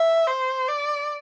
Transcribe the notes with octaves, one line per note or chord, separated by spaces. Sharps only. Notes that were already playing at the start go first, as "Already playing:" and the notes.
Already playing: E5
C5
D5